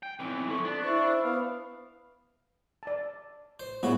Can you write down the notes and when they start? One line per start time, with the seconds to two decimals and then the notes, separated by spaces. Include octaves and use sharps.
0.03 G5
0.19 B1 E3 C4
0.49 F3 E4 A4 C#6
0.65 B3 D4
0.83 E4 C5 C#6
1.23 B3 F5
2.83 D5 A5
3.60 C5
3.83 A2 C#3 G3 B3 F#4